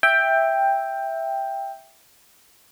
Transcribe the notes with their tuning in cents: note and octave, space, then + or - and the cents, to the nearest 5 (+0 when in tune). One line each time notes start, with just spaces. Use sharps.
E5 +0 G5 +10